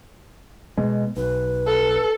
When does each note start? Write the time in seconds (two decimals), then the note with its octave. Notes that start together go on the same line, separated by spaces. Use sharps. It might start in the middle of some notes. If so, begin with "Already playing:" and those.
0.77 B2 G#3
1.17 B1 B4
1.67 A4